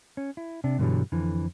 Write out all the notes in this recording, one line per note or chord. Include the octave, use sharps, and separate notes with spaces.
C#4
E4
C3 D4
G2 B2 D3 E3 F#3 G3
F2 D3 E3